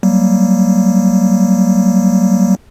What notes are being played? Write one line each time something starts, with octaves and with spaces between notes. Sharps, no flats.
F#3 G3 A#3